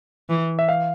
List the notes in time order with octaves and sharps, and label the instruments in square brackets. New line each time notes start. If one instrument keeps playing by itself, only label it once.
[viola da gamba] E3
[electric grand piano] E5
F5